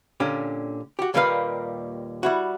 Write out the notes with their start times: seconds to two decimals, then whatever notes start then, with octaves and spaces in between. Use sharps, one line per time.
0.20 A#2 D3 C#4 G4
0.99 F#4 G4
1.14 D#2 A#2 G3 A#3 B4 F5
2.23 G3 E4 F#4